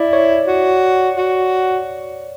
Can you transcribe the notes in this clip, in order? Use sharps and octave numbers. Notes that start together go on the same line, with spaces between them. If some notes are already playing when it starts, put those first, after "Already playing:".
Already playing: E4 D5
C#5
F#4
F#4